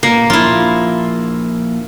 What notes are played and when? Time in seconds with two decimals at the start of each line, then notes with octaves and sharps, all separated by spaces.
0.03 A#2 A#3
0.30 A#1 E4 F4